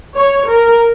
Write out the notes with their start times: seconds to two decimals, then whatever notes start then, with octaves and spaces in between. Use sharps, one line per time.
0.15 C#5
0.48 A#4